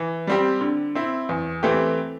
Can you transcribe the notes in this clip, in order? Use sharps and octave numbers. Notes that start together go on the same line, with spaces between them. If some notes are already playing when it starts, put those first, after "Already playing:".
Already playing: E3
G3 C4 G4
D3
C4 E4
E2
E3 A3 C4 G4